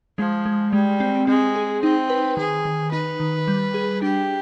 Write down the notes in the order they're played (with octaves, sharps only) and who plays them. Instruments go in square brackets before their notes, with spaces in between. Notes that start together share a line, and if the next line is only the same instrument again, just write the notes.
[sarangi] F3 [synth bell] G#3
[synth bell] G#3
[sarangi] G3 [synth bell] G#3
[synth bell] C4
[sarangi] G#3 [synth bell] C4
[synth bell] G#4
[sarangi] C4 [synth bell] D#4
[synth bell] B4
[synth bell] D#3 [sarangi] G#4
[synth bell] D#3
[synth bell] D#4 [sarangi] B4
[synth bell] D#3
G3
G#4
[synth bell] D4 [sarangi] G4